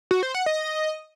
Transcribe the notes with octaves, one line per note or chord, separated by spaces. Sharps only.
F#4
C5
F#5
D#5